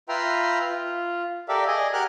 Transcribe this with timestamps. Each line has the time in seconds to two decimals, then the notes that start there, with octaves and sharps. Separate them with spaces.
0.09 F4 B4 E5 G5 A#5 C6
0.70 F4
1.49 G4 A4 A#4 D5 E5 F5
1.67 G#4 D5 D#5 G#5
1.93 G4 A#4 F#5 G#5 F6 F#6